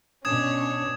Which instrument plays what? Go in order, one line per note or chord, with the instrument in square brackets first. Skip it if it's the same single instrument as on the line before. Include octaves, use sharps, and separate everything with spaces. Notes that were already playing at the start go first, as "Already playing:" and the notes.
[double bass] B2 D4 [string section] C#4 C#5 [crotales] D#6 G#6 E7